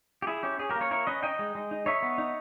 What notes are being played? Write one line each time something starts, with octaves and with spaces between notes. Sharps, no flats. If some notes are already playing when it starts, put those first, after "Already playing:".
G4
E4 G#4
C#4 G4
C#4 G#4
G4 A#4
A#3
A#4 C#5
E4 A#4 C#5
C#4 B4 D#5
D#4 D#5 G5
G#3
G#3
D#4
D#4 C#5 E5
B3
D#4